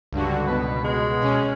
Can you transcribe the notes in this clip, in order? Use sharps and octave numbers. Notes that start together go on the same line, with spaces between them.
C#2 G2 D3 F#4
B2 B4
G#3
B2 C#4